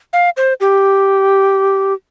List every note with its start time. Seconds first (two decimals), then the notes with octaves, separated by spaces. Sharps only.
0.13 F5
0.37 C5
0.60 G4